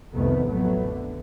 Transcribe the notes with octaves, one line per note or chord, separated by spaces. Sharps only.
C2 F2 C3 D#3 A3 B3
A1 F2 F#3 A3 B3
D3